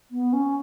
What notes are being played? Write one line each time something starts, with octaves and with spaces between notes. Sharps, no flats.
B3
C#4